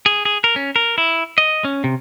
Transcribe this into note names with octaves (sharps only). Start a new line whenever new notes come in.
G#4
G#4
A#4
C#4
A#4
E4
D#5
C#4
C3